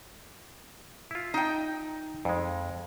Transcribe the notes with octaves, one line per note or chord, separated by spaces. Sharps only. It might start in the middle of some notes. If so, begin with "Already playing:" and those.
E4 F4
D#4 G5
F2 G#3